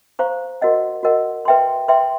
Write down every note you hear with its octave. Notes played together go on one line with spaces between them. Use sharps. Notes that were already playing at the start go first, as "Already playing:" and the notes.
C5 F5 A#5 C#6
F#4 A#4 D#5 F#5
F#4 A#4 D#5 F#5
B4 E5 G5 C6
B4 E5 G5 C6